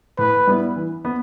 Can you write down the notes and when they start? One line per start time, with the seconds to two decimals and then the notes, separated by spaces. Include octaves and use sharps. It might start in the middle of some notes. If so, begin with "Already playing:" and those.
0.18 A2 B4
0.47 G3 B3 E4
0.76 E3
1.05 B3